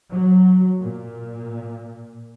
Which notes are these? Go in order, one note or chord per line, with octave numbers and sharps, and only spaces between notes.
F#3
A#2